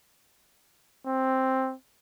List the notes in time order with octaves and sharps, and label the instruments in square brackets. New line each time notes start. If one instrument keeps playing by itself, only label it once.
[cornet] C4